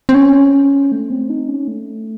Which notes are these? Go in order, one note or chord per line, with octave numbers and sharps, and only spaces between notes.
C4
C#4
A3
C4
D#4
C#4
A3